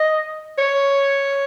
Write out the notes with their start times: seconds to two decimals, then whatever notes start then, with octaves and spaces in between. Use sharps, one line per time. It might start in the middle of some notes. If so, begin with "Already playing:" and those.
Already playing: D#5
0.58 C#5